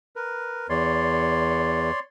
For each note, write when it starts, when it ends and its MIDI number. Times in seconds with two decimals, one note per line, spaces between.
0.16 0.67 70
0.16 0.67 71
0.69 1.91 40
0.69 2.00 73
0.69 2.00 74
0.69 2.00 84